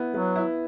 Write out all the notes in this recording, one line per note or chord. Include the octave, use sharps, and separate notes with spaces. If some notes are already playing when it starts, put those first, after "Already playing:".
Already playing: B3 E4
F#3 B3
E4